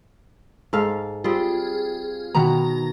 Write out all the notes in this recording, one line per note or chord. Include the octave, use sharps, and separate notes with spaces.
G#2 A4 F5
G3 C4 F4 G#4
B2 D#3 B3 A#5